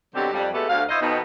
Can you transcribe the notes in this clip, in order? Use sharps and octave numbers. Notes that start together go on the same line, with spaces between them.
B2 D3 F#3 C4 G4
F2 G3
G#3 A3 B3 F#4 G4 A4
D2 F5
E4 C5 C#5 D#5
F2 B2 B3 D#4